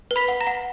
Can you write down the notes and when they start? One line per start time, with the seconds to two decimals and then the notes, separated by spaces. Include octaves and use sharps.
0.11 B4
0.16 B5 B6
0.28 F#5
0.41 A#5 A#6
0.47 F#5